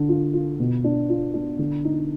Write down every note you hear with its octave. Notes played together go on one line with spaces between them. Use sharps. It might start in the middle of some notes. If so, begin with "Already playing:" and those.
Already playing: D3
F4
F4
B2
D4
F4
D4
D3
D#4